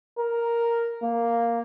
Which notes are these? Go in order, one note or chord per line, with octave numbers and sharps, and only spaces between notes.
A#4
A#3